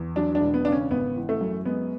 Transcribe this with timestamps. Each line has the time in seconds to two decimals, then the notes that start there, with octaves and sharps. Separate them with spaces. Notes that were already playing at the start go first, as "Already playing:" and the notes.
Already playing: E2
0.16 F#3 D4
0.35 D4
0.41 E1
0.54 B3
0.65 C#3 D4
0.72 C#4
0.91 G#1 B3
1.16 E3
1.29 A3
1.41 F#2
1.65 G#3 B3